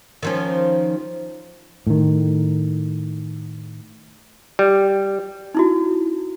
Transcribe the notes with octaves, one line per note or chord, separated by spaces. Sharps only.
D#3 F3 C#4
A2 D#3
G3
D#4 E4 F#4